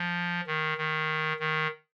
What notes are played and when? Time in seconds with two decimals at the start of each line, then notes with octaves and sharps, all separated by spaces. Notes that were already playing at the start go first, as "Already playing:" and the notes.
Already playing: F3
0.47 D#3
0.78 D#3
1.40 D#3